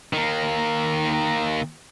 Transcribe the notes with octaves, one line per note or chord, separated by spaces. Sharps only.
D#3 A#3